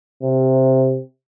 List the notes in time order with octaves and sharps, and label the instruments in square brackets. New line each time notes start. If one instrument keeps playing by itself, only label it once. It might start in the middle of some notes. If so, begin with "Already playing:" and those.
[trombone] C3